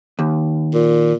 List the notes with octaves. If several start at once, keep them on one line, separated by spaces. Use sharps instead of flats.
D#2
A#2